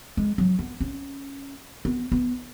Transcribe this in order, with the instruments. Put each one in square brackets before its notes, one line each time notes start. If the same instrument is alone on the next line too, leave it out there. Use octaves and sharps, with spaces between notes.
[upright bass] G#3
F#3
B3
C#4
B3
B3